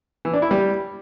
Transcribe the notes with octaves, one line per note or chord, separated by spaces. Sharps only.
E3
D4
E4
G3